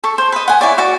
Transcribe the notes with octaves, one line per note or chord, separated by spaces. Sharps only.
A4 C#6
C5
B4 D#5
F#5 G#5
E4 C#5 D5
F#4 D5